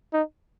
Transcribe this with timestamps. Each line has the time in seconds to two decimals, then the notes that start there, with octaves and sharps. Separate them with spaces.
0.13 D#4